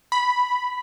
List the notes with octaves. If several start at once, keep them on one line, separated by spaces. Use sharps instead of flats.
B5